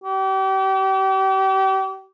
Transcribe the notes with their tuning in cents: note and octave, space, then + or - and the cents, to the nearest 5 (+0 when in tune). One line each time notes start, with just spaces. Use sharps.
G4 -35